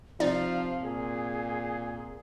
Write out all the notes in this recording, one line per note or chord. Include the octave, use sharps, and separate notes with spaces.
C3 F3 D#4 D5 F5
A#2 G#4